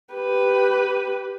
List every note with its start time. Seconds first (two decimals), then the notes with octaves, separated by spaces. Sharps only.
0.14 G4 B4